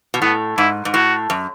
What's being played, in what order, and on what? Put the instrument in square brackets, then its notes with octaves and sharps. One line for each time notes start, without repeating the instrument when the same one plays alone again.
[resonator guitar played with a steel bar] B2
[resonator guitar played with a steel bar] A2 [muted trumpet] B3
[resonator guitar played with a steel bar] G#2 [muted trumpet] E4
[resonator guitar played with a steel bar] G#2
[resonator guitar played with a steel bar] A2 [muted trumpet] F#4
[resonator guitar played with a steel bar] F#2